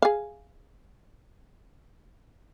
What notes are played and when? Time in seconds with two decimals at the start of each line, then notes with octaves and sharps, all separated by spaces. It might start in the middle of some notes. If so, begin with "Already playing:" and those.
0.02 G#4 F5